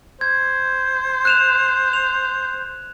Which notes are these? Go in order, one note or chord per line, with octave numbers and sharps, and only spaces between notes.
C5 G#6
F#6 E7 F7
F7